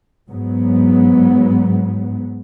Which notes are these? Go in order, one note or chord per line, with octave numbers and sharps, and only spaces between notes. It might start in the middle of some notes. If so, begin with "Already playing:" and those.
G#2 F#3 B3